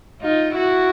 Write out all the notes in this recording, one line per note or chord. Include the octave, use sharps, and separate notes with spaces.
D#4 F4
E4 F#4